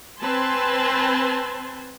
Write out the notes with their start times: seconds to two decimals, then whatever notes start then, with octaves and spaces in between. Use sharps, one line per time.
0.20 C4 B4 G#5 A5 C6